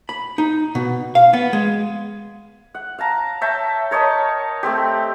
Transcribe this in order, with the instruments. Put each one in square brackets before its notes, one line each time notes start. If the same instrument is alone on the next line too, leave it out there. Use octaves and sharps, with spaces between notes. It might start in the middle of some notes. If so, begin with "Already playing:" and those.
[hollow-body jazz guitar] B5
D#4
B2
F5
B3
G#3
[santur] F#5
F5 A5 A#5
C#5 E5 G5 A5
A#4 C#5 D#5 A5
A3 C4 G4